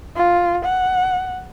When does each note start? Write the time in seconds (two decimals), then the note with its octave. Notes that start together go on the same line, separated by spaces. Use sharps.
0.16 F4
0.65 F#5